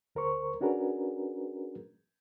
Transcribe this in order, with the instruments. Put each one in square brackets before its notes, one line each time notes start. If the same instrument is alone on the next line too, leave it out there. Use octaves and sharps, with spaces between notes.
[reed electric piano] D2 A#4 C5 C#6
C#4 D4 F#4 G#4 A#4 B4